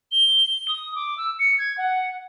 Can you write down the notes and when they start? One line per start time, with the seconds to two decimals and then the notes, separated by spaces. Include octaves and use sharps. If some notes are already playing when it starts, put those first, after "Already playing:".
0.12 G7
0.68 D#6
0.95 D6
1.17 E6
1.39 C#7
1.58 G#6
1.78 F#5